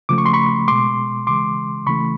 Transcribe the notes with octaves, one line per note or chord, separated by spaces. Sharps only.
C#3 F3 A3 D6
C#6
C6
B5 C#6
B2 G#3 C6 D6
C#3 E3 G#3 C6 D6
C#3 E3 A3 B5 C#6